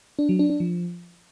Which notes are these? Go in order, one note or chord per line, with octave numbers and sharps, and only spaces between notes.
D4
F#3
D4
D4
F3